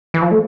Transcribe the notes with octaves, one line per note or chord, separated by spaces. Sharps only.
E3
F3
A3